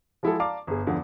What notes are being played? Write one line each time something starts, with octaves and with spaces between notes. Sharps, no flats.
F3 G#3 E4 F#4 G#4 A4
D5 F5 A5 A#5 D6
G1 G#4
E2 D3 F3 B3